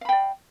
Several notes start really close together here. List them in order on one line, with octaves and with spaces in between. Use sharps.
F5 B5 G5 D5